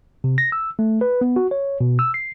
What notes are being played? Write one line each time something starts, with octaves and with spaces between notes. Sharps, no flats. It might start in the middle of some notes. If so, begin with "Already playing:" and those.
C3
A#6
E6
A3
B4
B3
F#4
C#5
B2
E6
C7